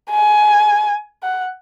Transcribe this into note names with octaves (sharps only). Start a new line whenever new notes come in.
G#5
F#5